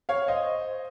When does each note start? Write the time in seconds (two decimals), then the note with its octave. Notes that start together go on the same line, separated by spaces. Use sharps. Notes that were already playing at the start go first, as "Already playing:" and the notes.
0.09 C#5 F5
0.28 C5 D#5